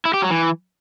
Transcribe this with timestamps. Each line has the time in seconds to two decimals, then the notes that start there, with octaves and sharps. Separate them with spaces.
0.05 E4
0.14 G4
0.22 F#3
0.31 E3